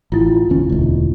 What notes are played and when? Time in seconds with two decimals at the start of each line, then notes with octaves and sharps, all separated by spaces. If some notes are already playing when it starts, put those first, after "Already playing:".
0.12 A1 E4 F4
0.49 F1 D#2 C#4
0.70 E1 D2